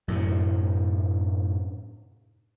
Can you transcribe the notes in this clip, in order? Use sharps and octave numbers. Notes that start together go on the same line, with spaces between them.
F#2 A2 C3